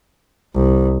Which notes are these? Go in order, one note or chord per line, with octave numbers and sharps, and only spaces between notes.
C2